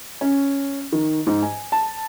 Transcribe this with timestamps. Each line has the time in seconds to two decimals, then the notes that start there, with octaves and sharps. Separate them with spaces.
0.21 C#4
0.92 D#3
1.27 G#2
1.42 G#5
1.72 A5